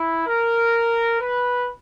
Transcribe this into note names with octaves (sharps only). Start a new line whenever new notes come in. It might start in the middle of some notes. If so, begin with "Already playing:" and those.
Already playing: E4
A#4
B4